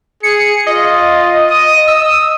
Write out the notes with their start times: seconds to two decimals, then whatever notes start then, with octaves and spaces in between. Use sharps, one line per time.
0.23 G#4 C#7
0.67 F4 D#5
1.51 D#6
1.87 D#6 E6